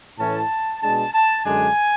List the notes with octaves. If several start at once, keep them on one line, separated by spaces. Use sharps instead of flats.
A2 E3 A3 C#4 A5
B2 G#3 D4 A5
A5
F#2 D3 G#3 D4 G#5